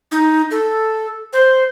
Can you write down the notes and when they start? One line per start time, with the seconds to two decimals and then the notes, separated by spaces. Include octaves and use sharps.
0.12 D#4
0.51 A4
1.33 C5